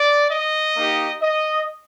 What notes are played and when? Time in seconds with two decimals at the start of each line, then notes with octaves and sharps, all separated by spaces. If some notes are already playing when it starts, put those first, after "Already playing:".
Already playing: D5
0.31 D#5
0.76 A#3 D#4 G4
1.22 D#5